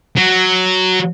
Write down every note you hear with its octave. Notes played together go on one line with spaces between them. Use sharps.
F#3